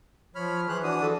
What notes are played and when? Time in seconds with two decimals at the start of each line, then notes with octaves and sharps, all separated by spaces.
0.35 F3 C#5 B5 F6
0.69 E3 G#4 C5 F#6
0.83 D4 F#4 D#6
1.02 A4